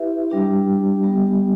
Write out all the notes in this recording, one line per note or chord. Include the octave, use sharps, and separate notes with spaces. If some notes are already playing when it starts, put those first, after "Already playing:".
Already playing: E4 G4 B4 E5
G3 D4 G4
G3 B3 G4